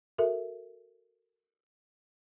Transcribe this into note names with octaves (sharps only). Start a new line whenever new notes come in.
F#4 A4 A#4 E5